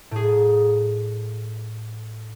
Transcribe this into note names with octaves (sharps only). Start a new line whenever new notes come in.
A2 G#4